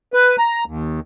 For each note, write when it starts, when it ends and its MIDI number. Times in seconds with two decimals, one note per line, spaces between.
0.13 0.36 71
0.39 0.64 82
0.66 1.00 39